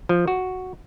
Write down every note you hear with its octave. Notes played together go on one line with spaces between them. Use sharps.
F3
F#4